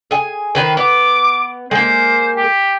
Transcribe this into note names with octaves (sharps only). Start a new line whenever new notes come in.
G#4 G#5
D#3 B4 C5
B3 D6
G#3 A#3 C5
G4